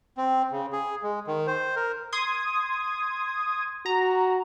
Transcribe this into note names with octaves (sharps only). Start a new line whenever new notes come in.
C4
C#3
G#4
G#3
D#3
C5
A#4
C6 D#6 G#6
F#4 A#5